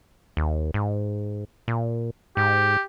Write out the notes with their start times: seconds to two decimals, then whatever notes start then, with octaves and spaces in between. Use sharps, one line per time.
0.37 D#2
0.74 G#2
1.68 A#2
2.37 G#2 G4